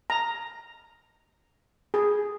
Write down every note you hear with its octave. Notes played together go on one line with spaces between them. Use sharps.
A#5
G#4